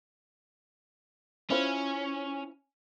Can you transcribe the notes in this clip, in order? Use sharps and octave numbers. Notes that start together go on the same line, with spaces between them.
C#4 E4 F4 C5